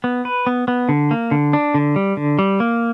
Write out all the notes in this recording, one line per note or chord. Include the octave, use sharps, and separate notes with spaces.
B3
B4
B3
B3
D3
A#3
D3
D4
D3
G3
D3
G3
A#3